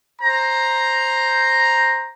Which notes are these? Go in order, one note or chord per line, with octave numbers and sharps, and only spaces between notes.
C5 A#5